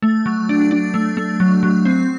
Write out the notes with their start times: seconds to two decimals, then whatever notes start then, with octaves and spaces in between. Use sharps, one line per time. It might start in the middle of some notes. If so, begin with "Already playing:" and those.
0.02 A3
0.26 F#3
0.49 D4
0.71 D4
0.94 A3
1.17 A3
1.40 F#3
1.63 F#3
1.85 C4